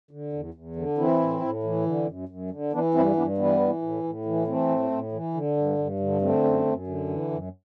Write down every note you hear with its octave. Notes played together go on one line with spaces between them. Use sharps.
D3
E2
E2
D3
E3 C4 E4
A2
A2
E3
D3
F#2
F#2
D3
E3 B3 D4
G2 C4 E4
G2 B3 D4
E3 G3 B3
E3
A2
A2
E3
E3 A3 C4
A2
A2
E3
D3
G2
G2
D3
D3 A3 C4
F#2
F#2
D3
E3
F#2